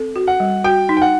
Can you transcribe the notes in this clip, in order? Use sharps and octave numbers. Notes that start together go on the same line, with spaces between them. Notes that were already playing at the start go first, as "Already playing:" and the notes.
Already playing: C4 A4
F#4
F#5
G3
F#4 G5
D#4
G5
F#5